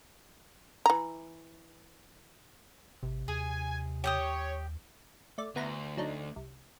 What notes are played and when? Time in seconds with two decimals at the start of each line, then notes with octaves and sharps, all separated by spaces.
0.86 E3 A#5
3.03 G#1 C3
3.28 D#2 G#4 G#5
4.04 G4 C#5 G5 D#6
5.38 A3 D5
5.56 D2 B3 E4 A#5
5.97 F#3 D4 D#4
6.36 C2